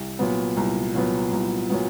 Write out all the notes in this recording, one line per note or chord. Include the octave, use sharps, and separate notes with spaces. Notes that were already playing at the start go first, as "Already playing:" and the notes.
Already playing: C2
A#2 F#3 B3
C2
A#2 F#3 B3
C2
A#2 F#3 B3